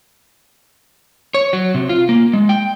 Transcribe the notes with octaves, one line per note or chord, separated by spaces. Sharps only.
C#5
F#3
C3
F4
A#3
G#3
G5